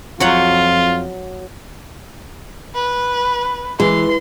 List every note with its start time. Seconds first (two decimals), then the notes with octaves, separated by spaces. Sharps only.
0.20 F2 F#3 F4 C#5 F#5
2.75 B4
3.80 E3 G#3 C6